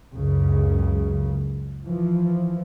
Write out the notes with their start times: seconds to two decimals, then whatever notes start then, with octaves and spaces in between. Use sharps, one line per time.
0.15 C#2 F#2 C#3
1.87 E3 F3